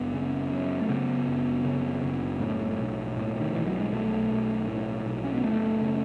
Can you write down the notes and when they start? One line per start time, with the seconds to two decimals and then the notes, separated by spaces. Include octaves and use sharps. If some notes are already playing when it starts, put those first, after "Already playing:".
Already playing: F#1 B3
0.14 C#3
0.52 F#2
0.81 A3
0.89 C#3 B3
1.27 F#1
1.65 C#3
2.03 F#1
2.40 A2
2.79 B1
3.17 A2
3.40 D#3
3.53 B1 E3
3.67 F#3
3.79 G#3
3.92 B1 A3
4.30 B1
4.68 A2
5.06 B1
5.24 C#4
5.34 B3
5.44 F#1 A3
5.81 C#3